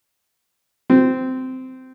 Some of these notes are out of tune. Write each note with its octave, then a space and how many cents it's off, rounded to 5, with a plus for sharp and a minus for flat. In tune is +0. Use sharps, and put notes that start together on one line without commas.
C4 -15